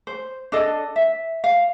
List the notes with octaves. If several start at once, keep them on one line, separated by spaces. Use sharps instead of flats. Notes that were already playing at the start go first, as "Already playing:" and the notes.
C5
D4 A4 D#5
E5
F5